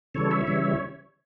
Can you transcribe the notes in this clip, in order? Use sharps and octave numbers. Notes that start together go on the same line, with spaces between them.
C#3 E3 G3 A4 C#5
C#5 E5
C#3 E3 G3